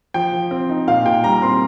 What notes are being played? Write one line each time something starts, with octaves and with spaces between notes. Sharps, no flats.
F3 G5
F3
C4
D#4
A#2 F5
A#2 G5
G3 A#5
C4 C6